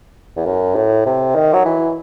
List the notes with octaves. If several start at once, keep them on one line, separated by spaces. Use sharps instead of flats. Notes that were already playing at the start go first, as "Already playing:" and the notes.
E2
F#2
A2
C3
D#3
F#3
E3